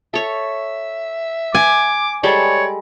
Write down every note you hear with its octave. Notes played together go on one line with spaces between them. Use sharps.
A4 C#5 E5
G#5 D6
G3 G#3 A4 C#5 D5